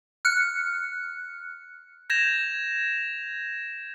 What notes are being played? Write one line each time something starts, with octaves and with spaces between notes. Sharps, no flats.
F6 F#6 C#7
G6 G#6 A#6 E7 F7